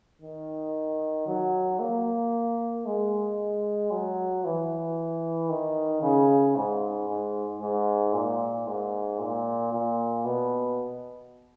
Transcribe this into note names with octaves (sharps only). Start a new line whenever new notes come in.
D#3
F#3
A#3
G#3
F#3
E3
D#3
C#3
G#2
G#2
G#2
A#2
G#2
A#2
A#2
B2